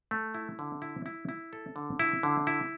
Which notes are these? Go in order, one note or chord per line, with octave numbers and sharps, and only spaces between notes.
A3
E4
D3
E4
E4
E4
A4
D3
E4
D3
E4